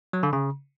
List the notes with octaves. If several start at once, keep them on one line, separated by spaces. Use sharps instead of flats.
F#3
D3
C#3